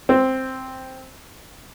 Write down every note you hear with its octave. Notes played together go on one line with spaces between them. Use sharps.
C4